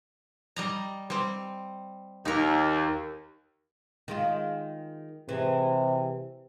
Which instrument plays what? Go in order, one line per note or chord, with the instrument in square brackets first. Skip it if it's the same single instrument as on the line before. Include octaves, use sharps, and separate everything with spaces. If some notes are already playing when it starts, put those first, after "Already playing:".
[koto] G3 D#5 A#5
G3 C4
[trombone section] D#2 [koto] D#4 A#4
[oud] D#3 G#3 F4
[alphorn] C3 [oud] E3 G#3